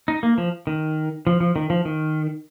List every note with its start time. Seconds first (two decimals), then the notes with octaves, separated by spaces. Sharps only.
0.08 D#4
0.23 A#3
0.38 F3
0.67 D#3
1.27 F3
1.40 F3
1.56 D#3
1.70 F3
1.85 D#3